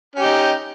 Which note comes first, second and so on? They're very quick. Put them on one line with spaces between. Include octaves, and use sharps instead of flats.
C#4 G4 D#4